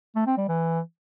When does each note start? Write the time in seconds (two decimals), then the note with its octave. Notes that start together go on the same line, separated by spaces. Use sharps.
0.15 A3
0.26 C4
0.37 G3
0.48 E3